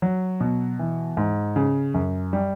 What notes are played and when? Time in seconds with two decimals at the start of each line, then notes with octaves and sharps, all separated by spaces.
0.02 F#3
0.40 B2
0.79 E3
1.17 G#2
1.56 C#3
1.94 F#2
2.33 G3